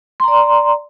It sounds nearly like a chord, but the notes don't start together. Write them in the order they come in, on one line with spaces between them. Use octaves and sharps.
C6 A#5 D5